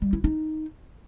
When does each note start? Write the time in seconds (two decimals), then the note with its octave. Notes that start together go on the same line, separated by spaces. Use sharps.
0.02 G3
0.13 E4
0.24 D#4